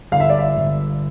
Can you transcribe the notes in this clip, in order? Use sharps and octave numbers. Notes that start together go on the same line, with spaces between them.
G1 F5
E5
D5
E5
G1